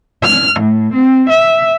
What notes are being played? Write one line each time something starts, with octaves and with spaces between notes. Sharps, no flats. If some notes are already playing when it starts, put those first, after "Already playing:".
F6
A2
C4
E5